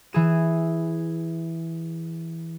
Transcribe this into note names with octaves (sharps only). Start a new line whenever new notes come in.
E3 G#4 E7